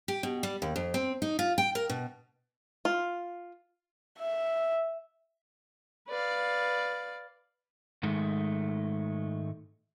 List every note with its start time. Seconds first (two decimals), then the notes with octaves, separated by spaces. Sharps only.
0.08 G4
0.23 B2
0.43 G3
0.62 D#2
0.76 F2
0.94 C4
1.22 D#4
1.39 F4
1.58 G5
1.75 A#4
1.89 B2
2.85 F4
4.19 E5
6.09 B4 D5 F5
8.03 G#2 D#3 G#3 A3